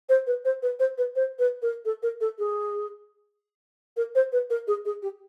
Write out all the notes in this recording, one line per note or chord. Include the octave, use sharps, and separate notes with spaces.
C5
B4
C5
B4
C5
B4
C5
B4
A#4
A4
A#4
A4
G#4
A#4
C5
B4
A#4
G#4
G#4
G4